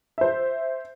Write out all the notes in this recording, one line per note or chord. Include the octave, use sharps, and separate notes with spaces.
C5 E5